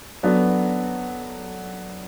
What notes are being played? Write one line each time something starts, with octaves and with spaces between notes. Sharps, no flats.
F#3 B3 D4 F#4 A4